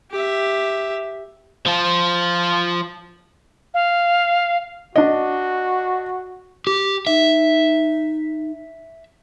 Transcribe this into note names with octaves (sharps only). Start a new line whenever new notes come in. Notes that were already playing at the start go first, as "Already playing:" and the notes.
G4 E5
F3 F4
F5
D4 F#4 D#5
G4
D#4 E5